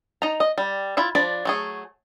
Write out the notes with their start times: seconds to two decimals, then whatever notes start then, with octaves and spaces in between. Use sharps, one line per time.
0.22 D#4 A#5
0.40 D#5
0.58 G3
0.97 E4 F4 E5
1.15 F3 D4 D5 B5
1.45 F#3 A3 G#4